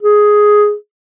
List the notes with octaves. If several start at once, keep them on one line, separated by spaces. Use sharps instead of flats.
G#4